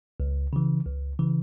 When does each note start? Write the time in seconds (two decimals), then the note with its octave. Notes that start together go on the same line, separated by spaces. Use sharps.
0.20 C#2
0.53 C#3 E3
0.85 C#2
1.19 C#3 E3